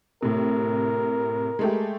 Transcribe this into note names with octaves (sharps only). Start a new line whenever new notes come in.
A2 C3 A#4
G#3 A3 G4